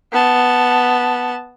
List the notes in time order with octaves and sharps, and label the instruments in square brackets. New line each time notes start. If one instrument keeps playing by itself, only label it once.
[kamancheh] B3 A5